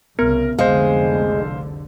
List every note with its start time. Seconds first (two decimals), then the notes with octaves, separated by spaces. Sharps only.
0.19 C2 C#3 B3 A#4
0.59 F1 C2 D3 G#3 C5 F5